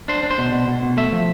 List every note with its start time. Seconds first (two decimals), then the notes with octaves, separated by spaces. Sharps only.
0.08 D4 C5
0.23 D4
0.31 C5
0.38 B2
0.52 B2
0.68 B2
0.82 B2
0.97 A3 E5
1.13 F3